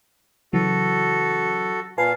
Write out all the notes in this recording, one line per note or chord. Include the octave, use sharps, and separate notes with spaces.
C#3 E3 F#3 F#4 A4
A#2 B4 F5 G#5 A5